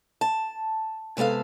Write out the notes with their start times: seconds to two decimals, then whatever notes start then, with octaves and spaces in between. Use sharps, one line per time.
0.21 A5
1.17 C3 G#3 B3 A4 F5